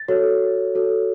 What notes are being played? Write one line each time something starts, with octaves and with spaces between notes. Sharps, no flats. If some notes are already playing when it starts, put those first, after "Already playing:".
Already playing: A6
F#4 A4 C#5
F#4 A4 C#5